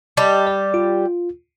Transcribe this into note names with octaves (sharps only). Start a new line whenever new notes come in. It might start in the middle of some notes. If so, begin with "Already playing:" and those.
G3 G4 D#5 A5
D5
F4